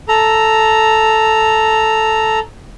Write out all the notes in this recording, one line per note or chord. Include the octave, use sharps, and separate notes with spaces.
A4 A#5